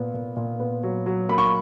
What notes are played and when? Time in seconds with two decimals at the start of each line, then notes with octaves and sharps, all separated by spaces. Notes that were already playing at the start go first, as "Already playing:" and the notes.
Already playing: A#2 B3
0.14 A#2
0.36 A#2
0.60 B3
0.83 F#3
1.06 F#3
1.29 A#3 B5
1.38 C#6